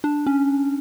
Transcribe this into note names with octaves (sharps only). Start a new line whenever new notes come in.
D4
C#4